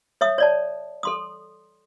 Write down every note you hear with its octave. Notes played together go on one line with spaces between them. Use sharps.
C#5 E5 D#6
C#5 D5 A5
A4 C6 D#6